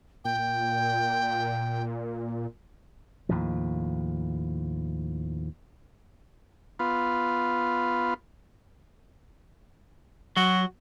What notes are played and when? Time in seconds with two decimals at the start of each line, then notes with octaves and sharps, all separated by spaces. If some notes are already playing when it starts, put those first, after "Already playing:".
0.25 A#2 G5
3.29 D#2 A2 F3
6.79 B3 F4
10.37 F#3 F#4